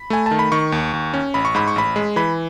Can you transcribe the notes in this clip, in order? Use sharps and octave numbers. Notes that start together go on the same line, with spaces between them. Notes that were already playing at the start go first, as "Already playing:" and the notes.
Already playing: B5
A3 G#5
A5
D#3
B5
D#3 C#6
D#2
D#2
C#4
A1 B5
C#6
G#2 B5
C#6
A1 B5
G#3
E3 B5